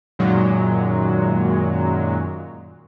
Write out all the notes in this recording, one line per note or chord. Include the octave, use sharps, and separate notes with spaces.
F#2 A#2 D#3 F#3 G#3